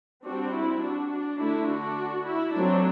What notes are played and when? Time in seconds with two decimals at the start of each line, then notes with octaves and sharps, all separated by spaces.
0.25 G3 C4 D4 F#4
0.54 E4
0.82 D4 F#4
1.12 D4
1.40 D3 A3 D4 E4
1.69 D4 F#4
2.26 E4
2.55 F#3 A3 C4 D4